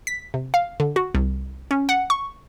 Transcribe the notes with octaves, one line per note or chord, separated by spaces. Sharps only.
B6
C3
F5
D3
F#4
C2
C#4
F#5
C#6